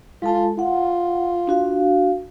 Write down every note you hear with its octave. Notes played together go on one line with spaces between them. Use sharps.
G#3 F4 A4 A5
F4 F#5
D4 F#4 F5